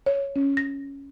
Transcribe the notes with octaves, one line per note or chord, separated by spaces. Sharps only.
C#5
C#4
A#6